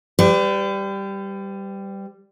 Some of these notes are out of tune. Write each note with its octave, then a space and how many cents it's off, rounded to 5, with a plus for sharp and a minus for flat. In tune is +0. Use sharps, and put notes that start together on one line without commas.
G3 +0 B4 +40